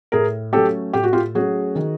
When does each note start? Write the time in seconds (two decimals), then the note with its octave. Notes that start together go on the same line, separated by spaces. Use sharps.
0.12 A2 G#4 A#4
0.53 F#3 A3 C#4 G4 A4
0.93 A2 G4
1.04 F#4
1.13 F4 G4
1.35 F#3 A3 C#4 F#4 G#4
1.75 D#3